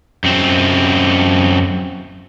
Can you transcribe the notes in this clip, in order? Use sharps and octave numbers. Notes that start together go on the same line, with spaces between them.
F#2 C4